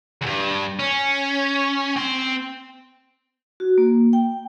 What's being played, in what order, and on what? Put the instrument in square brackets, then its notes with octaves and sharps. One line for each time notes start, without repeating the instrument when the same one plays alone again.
[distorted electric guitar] E2 G2
C#4
C4 C6
[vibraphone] F#4
A#3
G5